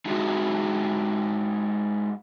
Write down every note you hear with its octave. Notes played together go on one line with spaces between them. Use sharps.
G#3 D#4 E4 F#4 G#4